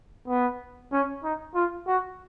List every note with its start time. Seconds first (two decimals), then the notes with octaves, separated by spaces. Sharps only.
0.28 B3
0.92 C#4
1.24 D#4
1.55 F4
1.87 F#4